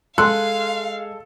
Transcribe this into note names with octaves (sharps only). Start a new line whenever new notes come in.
G#3 A4 F5 C6 F#6